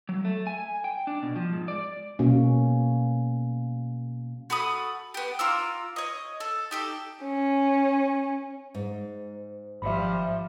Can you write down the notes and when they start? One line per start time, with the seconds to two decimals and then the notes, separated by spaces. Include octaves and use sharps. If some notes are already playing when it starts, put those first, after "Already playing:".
0.09 F#3
0.25 A3
0.47 G#5
0.84 G5
1.07 D4
1.23 B2
1.36 F3
1.53 G#2
1.68 D5
2.19 B2 A#3 C#4
4.50 F#4 A4 B5 D#6
5.14 B3 G4
5.39 F4 A#5 D6 E6
5.96 C#5 D#5
6.40 A4
6.71 D#4 G4 A4
7.23 C#4
8.74 G#2
9.82 G#1 F3 G3 E5 B5